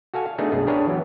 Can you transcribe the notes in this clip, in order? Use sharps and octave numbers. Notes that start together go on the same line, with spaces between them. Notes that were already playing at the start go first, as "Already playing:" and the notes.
F#4 A4 F5 G#5
F5
A3 B3 D4 D#4 G#4
B1 F#2 G#3 D4 G#4
D4 G4 G#4 A#4 B4 C#5
E3 F#3 B3